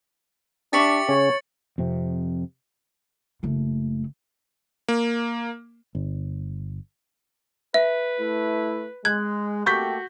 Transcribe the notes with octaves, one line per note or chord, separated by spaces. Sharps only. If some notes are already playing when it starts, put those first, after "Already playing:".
D4 G4 E5 C#6 A6 C#7 F#7
C#3 C#4 C#5
F2 C3
F#1 A3
A#3
G1
B4 E5
A3 E4
G#3 F#6 G#6
A3 A#3 F#4 G4 C#6 G6 B6